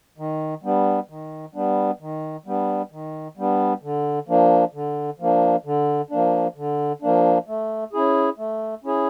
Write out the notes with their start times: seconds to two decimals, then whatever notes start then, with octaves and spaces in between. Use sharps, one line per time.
0.18 D#3
0.63 G3 B3 D4
1.09 D#3
1.54 G3 B3 D4
2.00 D#3
2.46 G3 B3 D4
2.91 D#3
3.37 G3 B3 D4
3.83 D3
4.28 F3 A#3 D4
4.74 D3
5.19 F3 A#3 D4
5.65 D3
6.10 F3 A#3 D4
6.56 D3
7.02 F3 A#3 D4
7.48 A3
7.93 C#4 E4 G#4
8.38 A3
8.84 C#4 E4 G#4